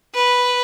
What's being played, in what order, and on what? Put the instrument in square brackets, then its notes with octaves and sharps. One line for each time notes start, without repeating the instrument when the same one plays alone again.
[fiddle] B4